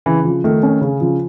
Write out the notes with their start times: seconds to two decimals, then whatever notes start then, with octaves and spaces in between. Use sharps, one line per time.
0.06 C#3 E3
0.25 F3
0.44 D#3 A3
0.63 C#4
0.81 C#3
1.01 F3